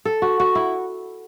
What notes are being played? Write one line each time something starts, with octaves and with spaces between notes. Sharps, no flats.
A4
F#4
F#4
E4